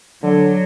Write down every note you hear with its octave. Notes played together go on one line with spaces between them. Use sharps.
D3 F#3